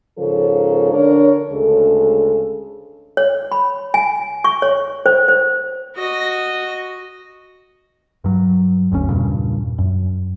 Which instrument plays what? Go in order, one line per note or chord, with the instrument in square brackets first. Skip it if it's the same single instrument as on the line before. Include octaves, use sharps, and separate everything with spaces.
[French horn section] G#2 C#3 F3 A4 A#4 C#5
D3 D4 A#4 C#5
D2 C#3 G#3 A4
[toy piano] C#5
B5
G#5
C#6
C#5
C5
C5
[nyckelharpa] F#4 D#5
[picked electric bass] G2 F#3
F#1 D2 C#3 C#4
E2 G2 A#2 C#3
F#2